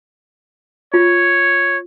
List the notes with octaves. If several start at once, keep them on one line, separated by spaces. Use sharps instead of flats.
F4 C#5